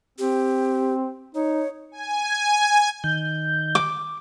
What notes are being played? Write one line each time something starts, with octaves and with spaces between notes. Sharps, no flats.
C4 G4
D#4 C#5
G#5
D#3 G6
D6